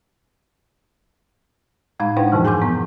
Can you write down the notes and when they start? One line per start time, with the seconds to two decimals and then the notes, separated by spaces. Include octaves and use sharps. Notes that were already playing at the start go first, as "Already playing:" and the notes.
2.00 A2 G#3 D#4 F5 B5 G#6
2.17 D4 E4 B4 C5 F#5 G5
2.32 F2 G#2 C3 E3 F3
2.45 G#4 G#5 C6 D6 G6
2.61 C3 B3